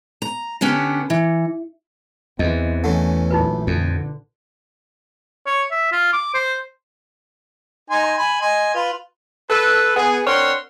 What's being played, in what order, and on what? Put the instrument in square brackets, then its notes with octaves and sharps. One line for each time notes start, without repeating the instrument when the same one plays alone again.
[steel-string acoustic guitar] A#5
D3 B3 C#4 G4
E3
[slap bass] E2 [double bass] E3 C4 [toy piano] D#5
[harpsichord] E3 A3 [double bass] C#4 [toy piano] F#5
[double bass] A#1 F#2 [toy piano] D#4 F4 B4
[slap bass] F2 [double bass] D3
[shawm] C#5
E5
F4
D6
C5
[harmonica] D#4 G#5 C6
G#5 B5
D#5 G#5 C6
F4 B4
[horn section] A4 B4
B3 G#4
C4 D4 A#4 C#5 F#5 C6